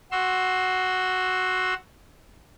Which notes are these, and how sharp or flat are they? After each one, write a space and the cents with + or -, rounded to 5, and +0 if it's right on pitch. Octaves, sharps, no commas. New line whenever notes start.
F#4 +0 C6 +15 E6 +0